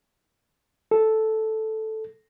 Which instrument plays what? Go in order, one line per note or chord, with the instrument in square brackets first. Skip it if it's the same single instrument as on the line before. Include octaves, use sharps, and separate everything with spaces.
[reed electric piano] A4